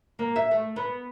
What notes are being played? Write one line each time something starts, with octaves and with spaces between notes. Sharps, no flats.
A#3
E5
A3
B3